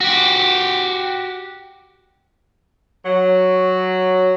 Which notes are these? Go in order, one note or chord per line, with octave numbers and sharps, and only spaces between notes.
F#4 G4
F#3